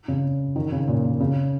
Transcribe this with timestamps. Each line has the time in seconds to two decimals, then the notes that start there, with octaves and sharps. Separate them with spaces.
0.08 C#3
0.56 D#3
0.72 C#3
0.88 A#2
1.04 A#2
1.20 C#3